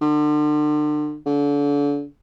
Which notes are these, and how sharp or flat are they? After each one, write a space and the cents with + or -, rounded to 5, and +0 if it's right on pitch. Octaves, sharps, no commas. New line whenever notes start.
D3 +35
D3 -35